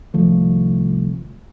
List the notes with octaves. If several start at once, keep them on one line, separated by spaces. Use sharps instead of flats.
C2 D#3 F3 A3